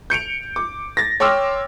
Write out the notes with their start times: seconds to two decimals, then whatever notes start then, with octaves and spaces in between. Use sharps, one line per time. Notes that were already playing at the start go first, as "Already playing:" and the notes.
0.10 G6 C#7 D7 F7
0.56 D6
0.97 A6 A#6
1.20 C#5 G5 C6 D6 E6 F6